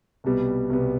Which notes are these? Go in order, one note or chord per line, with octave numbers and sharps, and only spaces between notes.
C2 B2 G3 B3
C2 B2 G3 B3